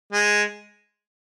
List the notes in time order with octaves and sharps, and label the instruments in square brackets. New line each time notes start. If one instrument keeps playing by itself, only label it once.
[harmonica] G#3